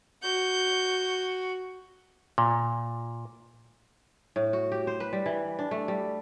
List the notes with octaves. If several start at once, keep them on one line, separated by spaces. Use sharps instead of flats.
F#4 G6
A#2
A2
F#4
G4
C5
B4
G3
E3
D4
A3
G3